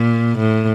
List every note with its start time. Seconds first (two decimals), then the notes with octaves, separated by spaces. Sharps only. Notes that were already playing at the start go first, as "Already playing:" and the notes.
Already playing: A#2
0.39 A2